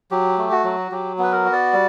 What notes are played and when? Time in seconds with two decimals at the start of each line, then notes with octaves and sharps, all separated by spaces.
0.11 F#3 G4
0.38 A3
0.52 F#4
0.64 F#3
0.91 F#3 G4
1.19 B3 B4
1.32 A#4
1.45 F#4
1.53 D5
1.73 G3